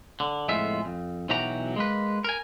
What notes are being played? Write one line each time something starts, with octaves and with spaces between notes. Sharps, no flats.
D3
F2 A2 G#3 B3 F4 E5
F2
B1 E3 F#3 F#4 G4 A#5
G#3 A#3 B4
A#4 G#5